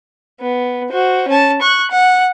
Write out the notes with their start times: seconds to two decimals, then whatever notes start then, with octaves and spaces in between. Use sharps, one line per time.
0.41 B3
0.90 F#4 C5
1.28 C#4 A5
1.61 C#6 F#6
1.91 F#5